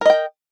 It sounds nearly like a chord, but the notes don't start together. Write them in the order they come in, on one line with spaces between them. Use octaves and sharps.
A#4 D#5 G5